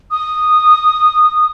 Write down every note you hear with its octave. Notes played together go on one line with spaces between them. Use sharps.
D#6